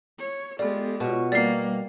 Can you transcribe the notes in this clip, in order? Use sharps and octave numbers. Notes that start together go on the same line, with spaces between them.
C#5
G#3 B3 F4 G4 A4 D5
B2 F4 C#5 C#6
G3 A#3 D5 C7